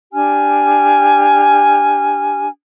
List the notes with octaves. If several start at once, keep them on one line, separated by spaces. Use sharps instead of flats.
D4 G4 G#5 F6